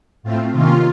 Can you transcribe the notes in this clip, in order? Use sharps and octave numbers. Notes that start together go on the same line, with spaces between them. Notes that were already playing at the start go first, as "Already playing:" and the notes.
A2 A3 C4 F4
C3 D#3 A#3 C#4 F4